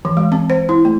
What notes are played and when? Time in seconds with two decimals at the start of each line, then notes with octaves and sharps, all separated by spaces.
0.05 E3
0.17 G#3
0.32 C4
0.50 C5
0.69 E4
0.85 A3